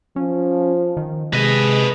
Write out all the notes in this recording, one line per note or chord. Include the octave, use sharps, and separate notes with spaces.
F3 C#4
D#3
C3 G#3 B4 D#5